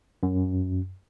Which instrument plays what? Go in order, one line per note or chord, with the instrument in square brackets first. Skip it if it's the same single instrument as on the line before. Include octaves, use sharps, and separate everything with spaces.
[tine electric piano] F#2